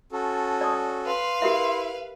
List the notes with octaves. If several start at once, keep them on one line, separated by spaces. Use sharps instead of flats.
C#4 F#4 A4 A5
D5 D#6
B4 F5 C6
E4 G4 A#4 E5